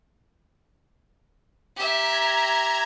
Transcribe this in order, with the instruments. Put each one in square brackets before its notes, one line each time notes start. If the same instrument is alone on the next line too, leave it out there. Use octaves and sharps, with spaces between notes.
[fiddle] G4 E5 [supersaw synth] A#5 G#6